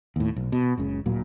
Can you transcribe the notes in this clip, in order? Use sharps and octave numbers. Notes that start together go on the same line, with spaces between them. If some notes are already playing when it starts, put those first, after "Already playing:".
D#2 A2
B1
B2
F#1 C#2 C#3
D1 A#2 F#3